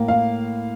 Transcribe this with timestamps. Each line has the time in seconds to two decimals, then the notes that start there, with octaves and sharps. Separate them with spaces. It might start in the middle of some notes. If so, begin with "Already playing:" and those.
Already playing: A2 A#3
0.08 F5